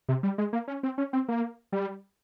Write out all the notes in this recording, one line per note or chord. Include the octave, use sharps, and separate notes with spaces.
C3
G3
G#3
A#3
C#4
C4
C#4
C4
A#3
G3